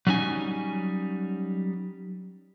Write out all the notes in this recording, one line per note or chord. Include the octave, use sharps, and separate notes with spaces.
F#3 G3 C#4 D#4 G#5